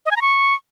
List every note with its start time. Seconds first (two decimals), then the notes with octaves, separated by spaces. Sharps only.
0.06 D#5
0.11 G#5
0.16 A#5
0.22 C#6